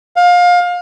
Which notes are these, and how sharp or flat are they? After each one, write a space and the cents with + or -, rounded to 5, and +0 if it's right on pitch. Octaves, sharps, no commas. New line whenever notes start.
F5 +25